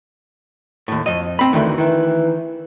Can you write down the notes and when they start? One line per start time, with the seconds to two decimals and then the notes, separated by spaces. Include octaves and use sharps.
0.88 D#2 A2
1.06 F2 D#5
1.39 C4 B5
1.53 D2 D#3 E3 A3
1.78 D#3 E3